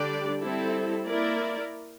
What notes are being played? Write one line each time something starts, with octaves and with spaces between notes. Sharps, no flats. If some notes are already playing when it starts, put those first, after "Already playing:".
Already playing: D3 G3 D4 G4 D5
G3 C4 E4 A4
A#3 E4 A#4 D5